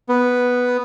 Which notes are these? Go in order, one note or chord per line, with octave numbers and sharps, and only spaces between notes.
B3